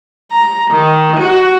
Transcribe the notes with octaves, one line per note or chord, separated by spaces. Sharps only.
A#5
D#3
F#4